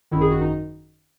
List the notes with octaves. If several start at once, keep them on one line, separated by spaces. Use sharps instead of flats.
G#1 F#2 D#3 E4
G#4
F#4
D#4